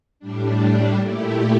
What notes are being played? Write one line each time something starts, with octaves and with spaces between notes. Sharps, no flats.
A2 G3 D4
A#2 A3 E4 G4